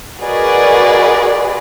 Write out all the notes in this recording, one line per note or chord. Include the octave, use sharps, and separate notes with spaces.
F#4 G#4 A#4 B4 D5 D#5